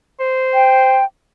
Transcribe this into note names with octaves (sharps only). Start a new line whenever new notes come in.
C5
G5